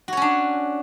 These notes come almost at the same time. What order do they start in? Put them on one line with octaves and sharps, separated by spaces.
F#4 C#5 C#4 D4